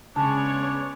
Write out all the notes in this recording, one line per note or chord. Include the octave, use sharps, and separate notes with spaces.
C#3 G#3 B3 D4 C#5 A5